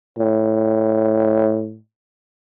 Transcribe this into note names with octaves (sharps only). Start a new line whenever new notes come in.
A2